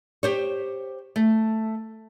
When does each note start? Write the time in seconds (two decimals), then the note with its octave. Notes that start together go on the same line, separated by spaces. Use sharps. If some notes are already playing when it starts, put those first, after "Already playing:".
0.23 G4 C5 C#5
1.16 A3